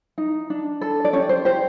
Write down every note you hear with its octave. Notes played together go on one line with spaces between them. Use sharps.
D#4
D4
A4
D5
C#4 G4 C#5
C5
G4 C5